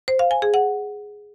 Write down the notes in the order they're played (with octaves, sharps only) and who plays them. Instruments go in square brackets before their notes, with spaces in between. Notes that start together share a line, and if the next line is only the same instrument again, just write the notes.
[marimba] C5
F5
G#5
G#4
F#5